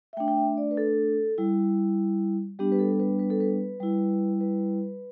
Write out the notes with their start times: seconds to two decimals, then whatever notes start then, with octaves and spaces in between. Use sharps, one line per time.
0.13 E5
0.17 A3 G5
0.20 D4
0.28 G5
0.37 E5
0.57 D5
0.71 B4
0.77 A4
1.38 G3 E4
2.59 G3 B3 D4 G4
2.72 B4
2.79 A4
3.00 B4
3.19 B4
3.30 A4
3.40 B4
3.80 G3 E4
4.41 B4